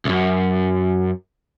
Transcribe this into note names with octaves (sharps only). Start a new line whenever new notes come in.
C2 F#2